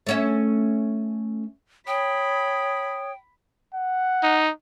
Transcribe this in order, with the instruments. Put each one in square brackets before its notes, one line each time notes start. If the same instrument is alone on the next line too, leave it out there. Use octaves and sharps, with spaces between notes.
[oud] A3 C#4 E5
[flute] C#5 [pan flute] G5 [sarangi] B5 [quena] D#6
[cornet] F#5
[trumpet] D#4